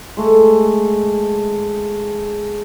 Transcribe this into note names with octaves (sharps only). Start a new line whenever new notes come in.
G#3 A3